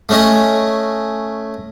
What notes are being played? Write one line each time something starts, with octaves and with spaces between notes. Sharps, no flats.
A3 C#4 D#5